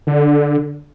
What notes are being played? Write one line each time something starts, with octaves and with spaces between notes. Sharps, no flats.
D3